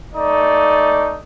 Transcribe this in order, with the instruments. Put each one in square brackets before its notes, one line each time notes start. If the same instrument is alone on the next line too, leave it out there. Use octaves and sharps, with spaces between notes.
[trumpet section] A3 D#4 D5